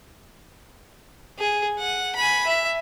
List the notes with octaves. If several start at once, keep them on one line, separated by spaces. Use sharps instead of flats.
G#4
F#5
G#5 B5
E5